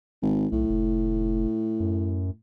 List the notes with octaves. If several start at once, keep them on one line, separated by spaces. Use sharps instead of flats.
G#1
B1 A2
F1
F#2